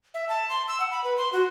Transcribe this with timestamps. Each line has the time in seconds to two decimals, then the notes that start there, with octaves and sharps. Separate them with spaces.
0.14 E5
0.29 A5
0.49 C6
0.68 E6
0.80 F#5
0.91 B5
1.04 B4
1.18 C6
1.33 F#4